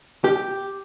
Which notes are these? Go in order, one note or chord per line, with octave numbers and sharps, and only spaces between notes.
G4